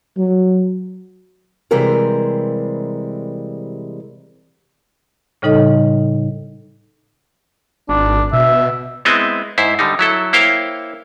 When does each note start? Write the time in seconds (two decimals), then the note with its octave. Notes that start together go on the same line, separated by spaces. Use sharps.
0.18 F#3
1.71 C3 E3 G3 G#3 C4 A#4
5.42 A2 C#3 G3 D#4 A4 D#5
7.89 G#1 D4
8.33 B2 E5
9.05 G#3 B3 C4 E4 D#5 E5
9.58 G#2 E4 C5
9.79 D3 G3 D#4
9.99 F#3 E4 A4
10.33 A#3 E4 C5 C#5 F5 G5